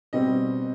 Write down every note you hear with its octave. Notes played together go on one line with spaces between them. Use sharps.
B2 G3 C4 D#5